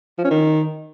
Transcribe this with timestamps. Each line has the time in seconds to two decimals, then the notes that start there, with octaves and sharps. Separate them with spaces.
0.18 F3
0.24 C#4
0.30 D#3